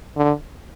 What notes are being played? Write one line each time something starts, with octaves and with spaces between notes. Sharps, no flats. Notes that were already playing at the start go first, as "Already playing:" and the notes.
D3